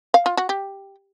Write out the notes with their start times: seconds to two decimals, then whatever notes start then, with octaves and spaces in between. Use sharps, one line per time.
0.14 F5
0.26 F4
0.37 F#4
0.49 G4